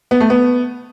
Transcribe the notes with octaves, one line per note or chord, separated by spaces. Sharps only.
B3
A3
B3